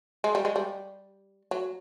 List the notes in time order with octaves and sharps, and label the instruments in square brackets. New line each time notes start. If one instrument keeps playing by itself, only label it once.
[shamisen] G#3
G3
G#3
G3
F#3